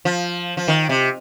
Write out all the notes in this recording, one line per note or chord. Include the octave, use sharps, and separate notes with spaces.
F3
F3
D#3
C3